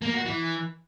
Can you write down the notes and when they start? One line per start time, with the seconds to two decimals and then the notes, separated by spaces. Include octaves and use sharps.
0.02 A#3
0.14 F#4
0.26 E3